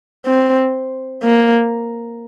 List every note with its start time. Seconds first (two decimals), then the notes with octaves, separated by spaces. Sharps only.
0.25 C4
1.23 A#3